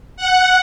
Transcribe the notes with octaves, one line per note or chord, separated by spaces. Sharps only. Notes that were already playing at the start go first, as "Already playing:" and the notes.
F#5